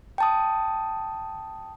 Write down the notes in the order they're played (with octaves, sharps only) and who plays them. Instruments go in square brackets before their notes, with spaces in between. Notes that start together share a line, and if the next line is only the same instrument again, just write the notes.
[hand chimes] G5 A5 D#6